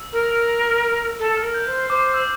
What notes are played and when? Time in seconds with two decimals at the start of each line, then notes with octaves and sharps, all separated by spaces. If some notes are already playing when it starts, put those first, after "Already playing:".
Already playing: E6
0.13 A#4
1.19 A4
1.37 F6
1.43 A#4
1.54 G6
1.67 C5
1.72 F6
1.90 C5 D6
2.14 E6